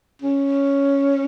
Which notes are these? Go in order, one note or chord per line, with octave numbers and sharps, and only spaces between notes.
C#4